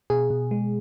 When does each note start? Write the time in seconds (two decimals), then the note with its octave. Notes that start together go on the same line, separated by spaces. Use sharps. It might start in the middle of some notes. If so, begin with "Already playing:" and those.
0.10 B2 G#4
0.30 B2
0.51 G#3